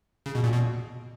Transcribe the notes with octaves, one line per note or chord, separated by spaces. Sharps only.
C#3
B2
A#2
B2